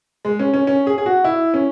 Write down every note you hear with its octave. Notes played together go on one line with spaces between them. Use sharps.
G#3
C#4
C#4
C#4
G#4
G#4
F#4
E4
C#4